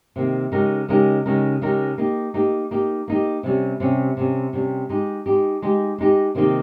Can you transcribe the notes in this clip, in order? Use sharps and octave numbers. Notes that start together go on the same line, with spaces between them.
C3 D#3 A#3
C#3 G#3 D#4 G4 A#4
C#3 G#3 D#4 G4 A#4
C#3 G#3 D#4 G4 A#4
C#3 G#3 D#4 G4 A#4
A#3 D#4 G4
A#3 D#4 G4
A#3 D#4 G4
A#3 D#4 G4
C3 G3 C#4
C3 G3 C#4
C3 G3 C#4
C3 G3 C#4
G#3 D#4 G4
G#3 D#4 G4
G#3 D#4 G4
G#3 D#4 G4
C3 D#3 A#3 D#4 G4